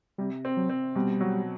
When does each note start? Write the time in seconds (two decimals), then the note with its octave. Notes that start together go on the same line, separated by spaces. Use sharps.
0.18 C3 G3
0.45 C4
0.57 F#3
0.70 C4
0.95 B2 G3
1.21 F#3